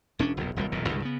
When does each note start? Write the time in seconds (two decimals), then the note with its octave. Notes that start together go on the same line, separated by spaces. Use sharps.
0.19 E1 C#4 D4
0.37 F1 B1
0.56 D#1 C2 C3 G3
0.72 D#1 B1 E2 A#2
0.89 C2 G2 D3 G#3
1.02 C#3 B3